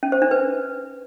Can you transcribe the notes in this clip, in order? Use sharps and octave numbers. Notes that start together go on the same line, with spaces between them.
C#4
C5
D4
B4